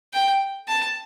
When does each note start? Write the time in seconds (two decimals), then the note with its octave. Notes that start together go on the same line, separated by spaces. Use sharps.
0.13 G5
0.68 A5